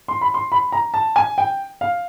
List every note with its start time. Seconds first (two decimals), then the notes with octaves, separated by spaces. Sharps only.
0.08 C6
0.21 B5
0.34 C6
0.52 B5
0.72 A#5
0.94 A5
1.16 G#5
1.38 G5
1.81 F5